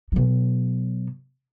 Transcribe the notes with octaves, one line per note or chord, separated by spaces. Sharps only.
B2 F#3